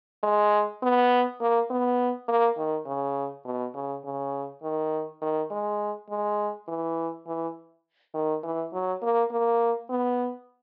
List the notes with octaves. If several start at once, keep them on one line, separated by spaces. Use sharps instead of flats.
G#3
B3
A#3
B3
A#3
D#3
C#3
B2
C#3
C#3
D#3
D#3
G#3
G#3
E3
E3
D#3
E3
F#3
A#3
A#3
B3